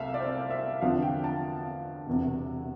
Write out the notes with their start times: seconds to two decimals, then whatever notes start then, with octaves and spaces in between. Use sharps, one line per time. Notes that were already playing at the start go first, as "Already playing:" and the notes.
Already playing: C2 C3 A3 C4 E5 F5
0.14 D5
0.20 C5
0.50 E5
0.82 E2 D3 F3 C4 F5
1.02 G5
1.24 A5
2.07 E1 E2 C3